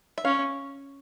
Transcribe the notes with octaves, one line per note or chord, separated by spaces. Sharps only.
E5
C#4 F5